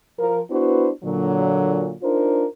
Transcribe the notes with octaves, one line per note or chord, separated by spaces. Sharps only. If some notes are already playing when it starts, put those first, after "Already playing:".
F3 A#4
B3 D4 E4 F#4 B4 C5
A#2 D3 F#3
D4 D#4 F4 A#4 C5